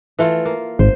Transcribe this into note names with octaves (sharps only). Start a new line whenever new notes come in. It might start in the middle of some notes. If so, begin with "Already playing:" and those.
E3 A3 F4
A#3
G#1 C5